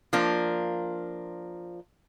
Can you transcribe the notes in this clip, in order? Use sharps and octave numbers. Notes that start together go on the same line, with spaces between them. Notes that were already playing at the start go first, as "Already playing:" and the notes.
F3 A#3 D4 F4